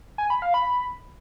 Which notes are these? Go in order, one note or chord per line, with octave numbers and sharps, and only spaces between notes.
G#5
B5
F5
B5